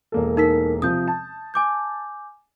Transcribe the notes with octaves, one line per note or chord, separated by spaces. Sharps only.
E1 A#3 A4
D#4 A#4 B6
C3 F3 D#6 G6
A5
G#5 D6 G6